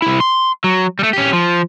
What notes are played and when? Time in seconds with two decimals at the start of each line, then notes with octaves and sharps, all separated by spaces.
0.02 C2 E4
0.20 C6
0.64 F#3
0.99 G3 A3
1.13 C#4 G4
1.33 F3